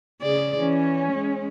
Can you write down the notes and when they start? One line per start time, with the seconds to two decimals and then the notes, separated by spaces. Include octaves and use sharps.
0.22 C#3 G#4 D5
0.59 E3 C#4
1.12 G#3